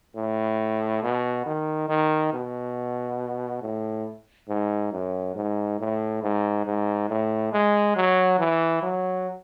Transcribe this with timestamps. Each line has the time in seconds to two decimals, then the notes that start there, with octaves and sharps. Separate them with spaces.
0.16 A2
1.03 B2
1.46 D#3
1.89 D#3
2.33 B2
3.62 A2
4.49 G#2
4.92 F#2
5.35 G#2
5.79 A2
6.23 G#2
6.65 G#2
7.09 A2
7.53 G#3
7.96 F#3
8.39 E3
8.82 F#3